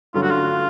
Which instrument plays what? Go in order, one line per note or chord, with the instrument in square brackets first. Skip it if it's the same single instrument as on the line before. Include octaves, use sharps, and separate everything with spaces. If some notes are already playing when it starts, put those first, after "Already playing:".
[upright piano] G2 D3 F#3 A3 C#4 [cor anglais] F4
[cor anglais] F#4
F4